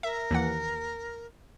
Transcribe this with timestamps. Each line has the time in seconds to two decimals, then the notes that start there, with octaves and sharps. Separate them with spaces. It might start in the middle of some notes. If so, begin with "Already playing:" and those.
0.03 A#4 E5
0.31 D#2 E3 F#5